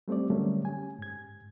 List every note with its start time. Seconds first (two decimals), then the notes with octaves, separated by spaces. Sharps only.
0.08 G3 A3 C4 G4 D5
0.30 D3 F#3 G3 A3 A#3 C#4
0.65 C#4 G4 G#5
0.98 G#2 G#6